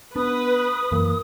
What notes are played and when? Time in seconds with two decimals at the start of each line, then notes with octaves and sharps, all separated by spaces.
0.16 B3 D4 B4 D#6
0.92 F#2 E3 A#3